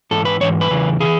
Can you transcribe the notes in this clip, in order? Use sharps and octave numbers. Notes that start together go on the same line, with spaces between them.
G#2 E3 A4
B4
G#2 E3 C#5
B4
E2 C#3 E3
C#3 E3 G#4